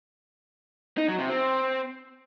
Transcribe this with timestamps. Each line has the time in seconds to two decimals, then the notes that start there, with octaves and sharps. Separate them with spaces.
0.97 D#4
1.08 F#3
1.19 C3
1.29 C4